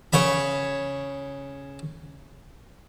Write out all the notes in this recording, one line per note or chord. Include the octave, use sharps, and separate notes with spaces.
C#3 C#5 B5